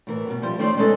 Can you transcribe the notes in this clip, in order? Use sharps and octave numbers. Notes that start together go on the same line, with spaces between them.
A2 E3 A#4
F#2 B2
F3 G3 E4 C5
D#3 A3 C#4 D#4 C5 D5
G3 G#3 B3 C#4 D#4 A4